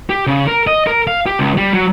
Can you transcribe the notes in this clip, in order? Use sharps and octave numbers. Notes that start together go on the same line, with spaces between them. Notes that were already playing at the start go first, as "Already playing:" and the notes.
G4
C#3
A#4
D#5
A#4
F5
G4
C#2
G3
F#3